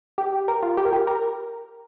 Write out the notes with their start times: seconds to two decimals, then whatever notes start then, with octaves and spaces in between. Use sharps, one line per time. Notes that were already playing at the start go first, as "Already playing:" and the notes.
0.18 G4
0.48 A#4
0.63 F4
0.77 G4
0.85 A#4
0.93 G4
1.07 A#4